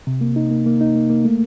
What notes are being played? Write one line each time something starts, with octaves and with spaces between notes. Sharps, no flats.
C3
A#3
D#4
A#3
A#3
D#4
A#3
A#3
A3